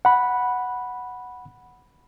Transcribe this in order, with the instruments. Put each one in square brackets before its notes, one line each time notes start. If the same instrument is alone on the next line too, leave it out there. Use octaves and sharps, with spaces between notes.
[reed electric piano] F#5 B5